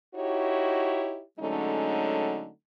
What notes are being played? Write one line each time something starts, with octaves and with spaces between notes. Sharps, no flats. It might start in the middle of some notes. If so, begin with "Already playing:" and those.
D#4 E4 F#4 G4 C#5
D3 F#3 G#3 A3 C#4 D#4